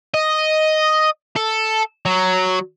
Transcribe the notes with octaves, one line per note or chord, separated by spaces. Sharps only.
D#5
A4
F#3